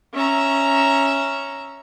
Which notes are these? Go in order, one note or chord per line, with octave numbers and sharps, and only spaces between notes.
C#4 E5 A#5